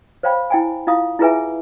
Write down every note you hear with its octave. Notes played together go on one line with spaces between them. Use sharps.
C5 C#5 F5 G5 B5
E4 G5 G#5
E4 F4 F5 D#6
E4 F4 G#4 B4 E5 G#5